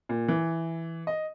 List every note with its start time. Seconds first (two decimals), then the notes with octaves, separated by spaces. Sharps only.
0.09 A#2
0.28 E3
1.07 D#5